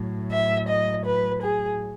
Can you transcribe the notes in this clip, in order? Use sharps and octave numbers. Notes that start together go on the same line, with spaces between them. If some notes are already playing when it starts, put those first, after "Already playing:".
Already playing: A2 F#3
E5
D#5
B4
G#4